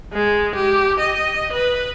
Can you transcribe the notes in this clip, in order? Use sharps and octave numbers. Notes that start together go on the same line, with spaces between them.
G#3
G4
D#5
B4